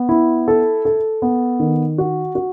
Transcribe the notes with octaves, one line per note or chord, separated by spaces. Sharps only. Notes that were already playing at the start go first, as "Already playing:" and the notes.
Already playing: B3
E4
A4
A4
B3
D#3
F#4
F#4